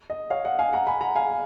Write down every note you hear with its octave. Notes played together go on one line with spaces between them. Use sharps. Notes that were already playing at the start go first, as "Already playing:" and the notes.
D#5
C#5 F5
D#5 F#5
F5 G#5
F#5 A#5
G#5 B5
F#5 A#5
F5 G#5